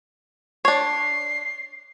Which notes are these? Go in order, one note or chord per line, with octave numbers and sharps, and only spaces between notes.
D4 C#5 C7